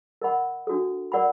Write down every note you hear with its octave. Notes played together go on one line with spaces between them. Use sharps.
A#4 D#5 F#5 B5
D4 F#4 A4
A#4 D5 F#5 B5